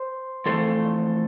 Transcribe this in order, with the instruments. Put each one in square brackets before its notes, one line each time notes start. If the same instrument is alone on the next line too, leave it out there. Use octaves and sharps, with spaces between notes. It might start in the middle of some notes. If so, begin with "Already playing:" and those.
Already playing: [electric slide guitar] C5
F2 E3 A3 A4 C5